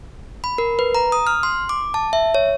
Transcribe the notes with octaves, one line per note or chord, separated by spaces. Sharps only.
B5
A#4
B4
A#5
D#6
F6
C6
D6
A5
E5
C#5